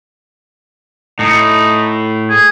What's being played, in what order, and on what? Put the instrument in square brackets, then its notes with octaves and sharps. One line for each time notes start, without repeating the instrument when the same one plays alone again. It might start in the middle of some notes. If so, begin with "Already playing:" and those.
[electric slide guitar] A2 [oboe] D#4
[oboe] G#4